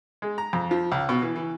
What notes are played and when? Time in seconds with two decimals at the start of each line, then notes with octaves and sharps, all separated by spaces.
0.22 G#3
0.38 A#5
0.53 F2
0.71 F3
0.92 C#2
1.09 B2
1.22 E3
1.36 E3